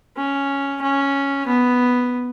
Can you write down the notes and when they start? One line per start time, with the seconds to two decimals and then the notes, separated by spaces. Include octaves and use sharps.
0.17 C#4
0.82 C#4
1.47 B3